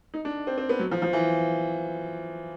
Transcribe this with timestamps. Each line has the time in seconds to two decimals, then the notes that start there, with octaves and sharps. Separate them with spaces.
0.14 D#4
0.25 D4
0.47 C4
0.58 C4
0.69 B3
0.80 F#3
0.91 F3
1.02 F3
1.13 E3